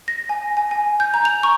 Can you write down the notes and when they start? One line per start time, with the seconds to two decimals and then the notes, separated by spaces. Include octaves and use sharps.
0.08 A#6
0.29 G#5
0.57 G#5
0.71 G#5
1.00 G6
1.14 A#5
1.25 F7
1.43 C#6